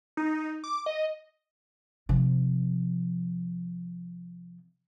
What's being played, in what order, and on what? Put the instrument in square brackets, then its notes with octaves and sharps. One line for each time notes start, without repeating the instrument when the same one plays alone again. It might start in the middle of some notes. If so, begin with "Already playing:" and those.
[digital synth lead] D#4
D6
D#5
[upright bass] C3 F3